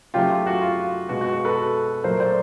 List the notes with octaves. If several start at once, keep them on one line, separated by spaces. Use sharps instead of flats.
C#3 F#3 A3 F4 G4
F4
F#4
F4
B2 G#3 F#4
F#4
F#4
A4 B4
A#2 F#3 A3 A#4 C5
C5 D5